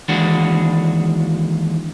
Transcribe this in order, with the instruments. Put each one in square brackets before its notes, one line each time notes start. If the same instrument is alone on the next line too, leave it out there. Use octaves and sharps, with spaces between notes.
[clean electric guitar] D#2 E3 G#3 D4 F#4